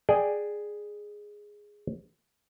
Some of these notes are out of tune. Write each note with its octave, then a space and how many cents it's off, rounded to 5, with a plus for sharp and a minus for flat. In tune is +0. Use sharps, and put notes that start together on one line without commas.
G#4 +0 D5 +15 G5 +0